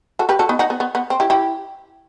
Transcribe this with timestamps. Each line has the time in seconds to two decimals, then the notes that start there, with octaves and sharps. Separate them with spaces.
0.19 F#4 A4
0.29 G4 B4
0.39 F#4 A4
0.49 B3 D#4
0.59 D#4 F#4
0.70 B3
0.80 B3
0.95 B3
1.10 C4
1.20 E4 G4
1.30 E4 G4